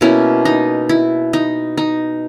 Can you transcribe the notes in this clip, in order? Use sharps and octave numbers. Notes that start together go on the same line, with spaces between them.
B2 A#3 C#4 E4
D#4
E4
D#4
D#4